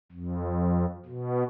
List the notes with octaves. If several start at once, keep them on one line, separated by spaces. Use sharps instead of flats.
F2
B2